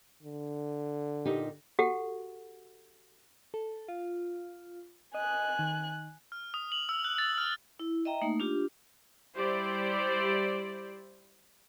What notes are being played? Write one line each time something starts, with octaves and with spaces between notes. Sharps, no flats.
D3
A#2 D#4 G4
F#4 G4 A4 F#5
A4
F4
D#5 G#5 F#6
D#3
F6
D#6
F#7
E6
F#6
A6
F6
E4
D#5 E5 G5 A#5
A3 A#3 D#4
D4 F4 G4
G3 E4 G4 C5 D5